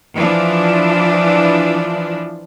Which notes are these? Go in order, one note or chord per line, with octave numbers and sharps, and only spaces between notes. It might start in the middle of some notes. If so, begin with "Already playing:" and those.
E3 F3 D4